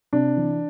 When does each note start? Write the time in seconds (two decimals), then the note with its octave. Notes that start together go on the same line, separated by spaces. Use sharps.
0.13 C3 D4
0.37 E3